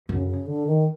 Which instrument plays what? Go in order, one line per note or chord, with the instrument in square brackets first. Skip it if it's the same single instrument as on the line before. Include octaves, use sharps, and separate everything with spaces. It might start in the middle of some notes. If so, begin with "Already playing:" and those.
[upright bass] F#2 [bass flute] C#3
[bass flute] C#3
D3
D#3